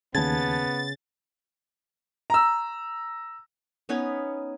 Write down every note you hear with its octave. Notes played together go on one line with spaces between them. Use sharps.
D#2 C#3 B3 A5 G#6 A6
A#5 E6
B3 C#4 D#4 C#5